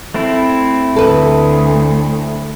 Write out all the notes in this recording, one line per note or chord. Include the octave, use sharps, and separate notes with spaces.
A3 C4 E4
D2 A4 B4